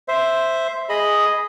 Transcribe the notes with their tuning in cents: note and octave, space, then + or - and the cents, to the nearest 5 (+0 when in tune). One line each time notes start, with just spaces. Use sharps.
C5 +0 E5 +0
G#4 +0 D#5 +0 B5 +0